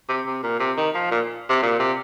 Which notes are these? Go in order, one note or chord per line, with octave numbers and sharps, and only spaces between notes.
C3
C3
A#2
C3
D#3
F3
A#2
C3
A#2
C3